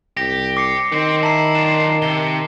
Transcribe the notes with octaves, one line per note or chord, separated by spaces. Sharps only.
C2 G4 A#6
D6 C7 C#7
D#3 C4 C5
E4 A5 A#5 C7
D4 F4 E7
C3 G7